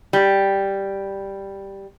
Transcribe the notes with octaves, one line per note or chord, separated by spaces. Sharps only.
G3 G4